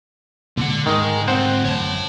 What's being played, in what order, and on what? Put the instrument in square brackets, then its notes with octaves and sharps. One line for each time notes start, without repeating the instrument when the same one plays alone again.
[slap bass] A#2 G#3 [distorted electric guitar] D3 F#5
[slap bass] G#2 [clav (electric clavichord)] D#3 [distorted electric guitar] G#3
[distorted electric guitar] D2 C4 [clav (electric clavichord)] C5 F#5 G5
[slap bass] A1 F#2 D3 [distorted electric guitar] C#5 A5